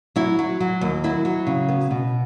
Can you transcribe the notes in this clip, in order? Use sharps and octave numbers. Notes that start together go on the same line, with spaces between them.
F#3 E4
F#3
F#3
D#2
F#3 E4
F#3
C#3
B3
B2